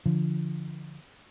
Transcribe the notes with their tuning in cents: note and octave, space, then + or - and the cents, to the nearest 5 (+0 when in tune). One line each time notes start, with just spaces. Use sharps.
D3 -10 F3 -20